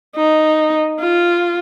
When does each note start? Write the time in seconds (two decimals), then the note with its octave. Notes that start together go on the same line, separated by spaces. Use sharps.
0.17 D#4
0.99 F4